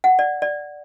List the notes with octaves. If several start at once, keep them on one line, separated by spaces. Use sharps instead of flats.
F#5
D5
D5